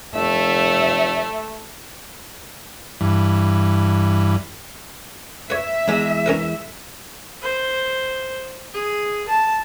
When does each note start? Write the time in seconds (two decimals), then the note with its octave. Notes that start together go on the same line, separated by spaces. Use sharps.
0.14 F1 A3 E5
3.01 G2 E3
5.50 B4 C#5 E5
5.88 E2 G#3
6.26 C#4 A#4 B4
7.42 C5
8.73 G#4
9.28 A5